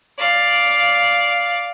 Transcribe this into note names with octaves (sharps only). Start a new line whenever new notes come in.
D5 F5